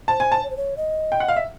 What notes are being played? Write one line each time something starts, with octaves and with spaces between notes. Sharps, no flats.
C5 A5
G#5
A5
C#5
C5
C#5
D#5
G5
F#5
F5
E5